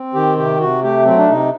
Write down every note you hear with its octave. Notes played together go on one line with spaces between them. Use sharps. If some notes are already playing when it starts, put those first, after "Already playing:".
Already playing: C4
D#3 G4
C3 G4
C3 F#4
A3 G4
F#3 C4
D4
C3 D#4